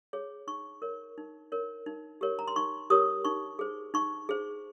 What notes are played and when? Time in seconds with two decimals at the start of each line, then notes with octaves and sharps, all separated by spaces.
0.13 G#4 C#5
0.47 D#4 C#6
0.82 A#4 C#5
1.18 D#4
1.52 A#4 C#5
1.86 D#4
2.21 G4 A#4 C#5
2.39 A#5
2.48 C6
2.56 D#4 C#6
2.90 G4 A#4 C#5 D#6
3.24 D#4 C#6
3.59 G#4 C5
3.94 D#4 C#6
4.29 G#4 C5